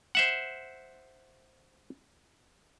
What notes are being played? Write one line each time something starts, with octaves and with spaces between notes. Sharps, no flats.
C5 E5 F#5